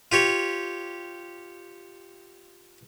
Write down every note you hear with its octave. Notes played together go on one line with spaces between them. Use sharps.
F4 G4 C#5